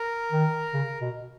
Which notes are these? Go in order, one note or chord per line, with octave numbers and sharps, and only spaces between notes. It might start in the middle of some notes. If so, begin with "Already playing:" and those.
Already playing: A#4
D#3
C#3
B2